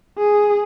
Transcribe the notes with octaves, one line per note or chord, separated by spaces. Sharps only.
G#4